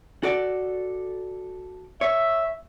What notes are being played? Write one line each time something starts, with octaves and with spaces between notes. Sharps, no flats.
F#4 A4 D5
C#5 E5